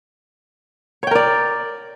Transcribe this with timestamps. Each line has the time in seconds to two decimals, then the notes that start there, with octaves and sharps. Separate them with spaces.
1.03 C#5
1.07 G5
1.11 A#4
1.15 D5